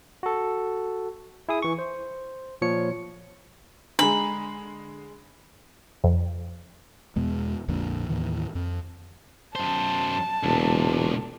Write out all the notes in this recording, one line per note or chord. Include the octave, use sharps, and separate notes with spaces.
F#4 A4
E4 G#4 D#6
E3 C#6
C5
A#2 F3 C#5 C#7
D3 G#3 D4 A#5 B5
F2
E2 B2 G#3
A#1 F2 A#2 D3
D#2 A2 D#3 E3
F2
F#2 C5 A5
E1 C#2 A#2